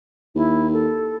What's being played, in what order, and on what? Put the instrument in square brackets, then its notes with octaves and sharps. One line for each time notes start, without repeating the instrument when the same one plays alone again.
[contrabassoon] D#2 [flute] E4
[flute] A4